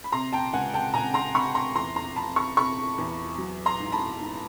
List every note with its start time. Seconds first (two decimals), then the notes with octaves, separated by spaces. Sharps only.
0.04 B5
0.12 C3 A#5 C6
0.33 G5 A5
0.53 C#2 F#5 G#5
0.74 G5 A5
0.94 C#2 G#5 A#5
1.14 A#5 C6
1.35 C3 B5 C#6
1.55 A#5 C6
1.76 E2 A#5 C6
1.96 A#5 C6
2.16 F3 A5 B5
2.36 B5 C#6
2.57 C3 B5 C#6
2.98 E2
3.38 F#3
3.66 A#5 C6
3.80 G#2
3.92 A5 B5
4.20 G#2